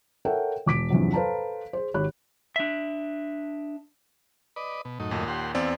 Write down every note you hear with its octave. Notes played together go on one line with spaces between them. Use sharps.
A4 A#4 C#5 E5 F#5 G5
E1 D6 B6 D7
E2 G2 C3 F3 F#3
A4 B4 C5 F5 A5 A#5
G#4 C5
G#1 G4 C#5 B5 F#6
D4 E5
B4 D5 D#5
B2
F#2 A2 D#4
D#2 A#2
G4 F#5 C6
E2 C4 D5 F5